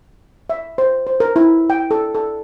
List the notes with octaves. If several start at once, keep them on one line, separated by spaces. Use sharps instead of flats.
E5
C5
C5
A#4
E4
G5
A4
A4